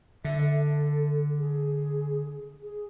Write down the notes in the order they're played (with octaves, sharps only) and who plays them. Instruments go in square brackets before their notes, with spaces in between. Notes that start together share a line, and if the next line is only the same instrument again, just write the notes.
[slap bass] D3 [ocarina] E5
[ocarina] A4
G#4
G#4